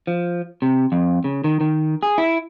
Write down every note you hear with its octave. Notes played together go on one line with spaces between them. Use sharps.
F3
C3
F2
C#3
D#3
D#3
G#4
E4